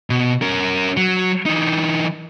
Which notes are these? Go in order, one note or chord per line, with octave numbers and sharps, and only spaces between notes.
B2
C#4 A#4
F#3
E3 D#4